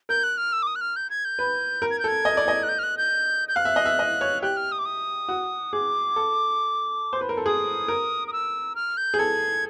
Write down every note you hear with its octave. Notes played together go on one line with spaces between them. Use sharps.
A#4 G6
F#6
F6
E6
D6
D#6
F#6
F6
G6
G#6
G6
B4
A#4
G#6
G6
A4 G#6
D#5
D5
D#5
F#6
G6
F6
F#6
G6
G6
F5 F#6
E5
D#5
E5
D#5
C#5
G4 F#6
F6
D#6
D6
D#6
F#4
G#4 D6
A4
C5
B4
A#4
A4
G#4 D#6
A#4
D#6
E6
F6
G6
G#4
A4 G#6